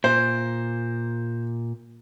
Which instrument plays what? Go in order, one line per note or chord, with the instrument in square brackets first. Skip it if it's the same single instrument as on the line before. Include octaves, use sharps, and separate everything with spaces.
[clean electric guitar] A#2 [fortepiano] C5